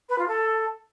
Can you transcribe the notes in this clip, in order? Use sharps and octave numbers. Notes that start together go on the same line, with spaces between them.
B4
F4
A4